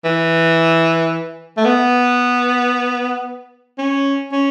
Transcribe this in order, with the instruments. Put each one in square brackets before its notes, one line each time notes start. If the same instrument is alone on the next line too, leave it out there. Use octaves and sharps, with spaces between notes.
[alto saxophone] E3
A3
B3
C#4
C#4